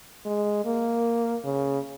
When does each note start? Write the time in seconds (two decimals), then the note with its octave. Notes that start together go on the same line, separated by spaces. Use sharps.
0.25 G#3
0.65 A#3
1.44 C#3